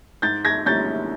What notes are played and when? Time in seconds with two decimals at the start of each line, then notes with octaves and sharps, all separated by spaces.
0.22 G#2 G6 A6
0.45 G#6 A#6
0.66 D#3 G3 A#3 C#4 G6 A6